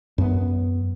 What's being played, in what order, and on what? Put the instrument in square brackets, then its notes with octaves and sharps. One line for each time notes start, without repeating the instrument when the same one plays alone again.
[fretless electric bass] F#2 B3